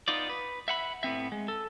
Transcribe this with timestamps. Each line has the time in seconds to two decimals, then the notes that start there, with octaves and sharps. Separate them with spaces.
0.08 B3 D#4 F4 D5
0.29 B4
0.68 E5 F#5 B5
1.03 A2 B3 C4 E5
1.32 G#3
1.48 A4